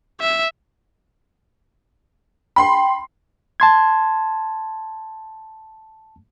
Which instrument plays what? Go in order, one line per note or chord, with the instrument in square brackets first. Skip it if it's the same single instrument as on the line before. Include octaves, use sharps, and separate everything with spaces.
[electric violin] E5
[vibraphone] G5 [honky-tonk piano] B5 C6 C7
[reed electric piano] A5 C6 G#6